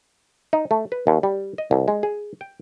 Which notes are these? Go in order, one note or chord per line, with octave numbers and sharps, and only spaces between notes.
D#4
A3
B4
D#2
G3
D#5
C2
G#3
G#4
G5